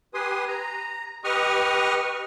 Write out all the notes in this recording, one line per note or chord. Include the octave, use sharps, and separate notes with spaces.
G4 B4 G#5 C6 D#6
A#5
G4 B4 D#5 C#6 D#6 F6